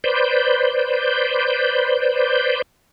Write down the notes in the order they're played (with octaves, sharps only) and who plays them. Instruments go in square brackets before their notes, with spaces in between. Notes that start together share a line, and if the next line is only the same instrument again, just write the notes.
[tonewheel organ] B4 C5 D5 G6